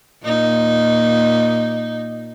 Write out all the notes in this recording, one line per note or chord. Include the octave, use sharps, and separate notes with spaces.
A#2 D#4